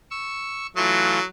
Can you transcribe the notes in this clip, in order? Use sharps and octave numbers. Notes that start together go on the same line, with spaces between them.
C#6 E6
E3 F#3 A3 F4